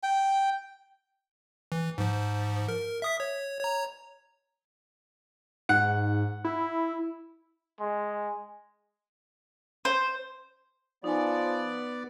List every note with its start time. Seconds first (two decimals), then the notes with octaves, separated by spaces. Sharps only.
0.03 G5
1.72 E3
1.98 G#2 F3
2.68 A#4
3.02 E5 D#6 B6
3.20 C#5
3.60 C#5 A#5
5.69 G#2 F#5
6.44 E4
7.80 G#3
9.85 C5
11.04 F3 B3 D#4 D5 G#5